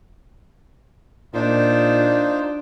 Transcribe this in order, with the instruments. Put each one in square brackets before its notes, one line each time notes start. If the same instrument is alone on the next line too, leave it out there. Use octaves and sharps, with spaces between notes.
[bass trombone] A#2 [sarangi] D4 [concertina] D#4 F4 C5